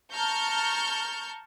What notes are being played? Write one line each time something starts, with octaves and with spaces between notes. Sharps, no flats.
A5 A#5 C#6 F6 G6